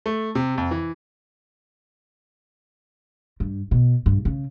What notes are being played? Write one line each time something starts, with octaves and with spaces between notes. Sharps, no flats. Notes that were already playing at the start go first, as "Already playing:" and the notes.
A3
C3
F2
E3
G2
B2
G2
C#3